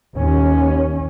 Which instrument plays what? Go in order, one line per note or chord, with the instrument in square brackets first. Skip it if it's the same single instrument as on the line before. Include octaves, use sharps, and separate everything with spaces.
[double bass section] D#2 C#4